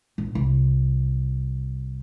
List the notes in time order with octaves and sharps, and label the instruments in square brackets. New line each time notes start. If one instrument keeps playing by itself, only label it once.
[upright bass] A#1
C2